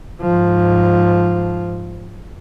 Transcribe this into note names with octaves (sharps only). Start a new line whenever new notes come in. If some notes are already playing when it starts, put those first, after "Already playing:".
G#2 F3